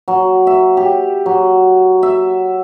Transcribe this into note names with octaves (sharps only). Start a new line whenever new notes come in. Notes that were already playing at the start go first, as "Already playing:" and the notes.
F#3
E5
G4
F#3
E5